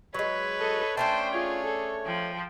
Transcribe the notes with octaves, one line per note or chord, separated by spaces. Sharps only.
F#3 G#3 B4 C#5
A4 D#5
A3 C#4 D4 C5 G5 A5
F4 G#4 C#5
A4
F3 G5